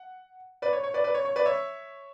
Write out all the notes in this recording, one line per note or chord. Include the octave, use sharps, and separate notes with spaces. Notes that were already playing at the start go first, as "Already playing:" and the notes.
Already playing: F#5
B4 D5
C#5
C#5
B4 D5
B4 D5
C#5
C#5
B4 D5
C#5 E5